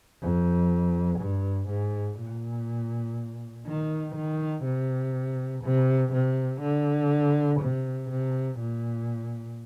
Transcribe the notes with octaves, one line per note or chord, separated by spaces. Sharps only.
F2
G2
G#2
A#2
D#3
D#3
C3
C3
C3
D3
C3
C3
A#2